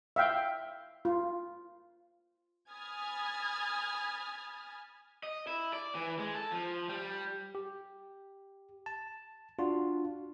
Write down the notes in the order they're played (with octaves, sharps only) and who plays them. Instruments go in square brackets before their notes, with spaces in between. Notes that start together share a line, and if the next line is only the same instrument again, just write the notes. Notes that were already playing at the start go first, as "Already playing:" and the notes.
[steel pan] E5 F5 G5
F4
[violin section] G#5 B5 D#6 F6 G#6 A6
[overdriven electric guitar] D#5
E4
D5
E3
G#3
A4
F3
G3
[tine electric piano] G4
A5
D4 F4 F#4